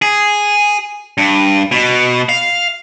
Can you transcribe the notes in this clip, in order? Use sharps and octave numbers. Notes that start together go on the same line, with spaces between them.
G#4
G2
B2
F5